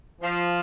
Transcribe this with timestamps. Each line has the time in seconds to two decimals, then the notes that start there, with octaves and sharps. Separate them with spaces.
0.22 F3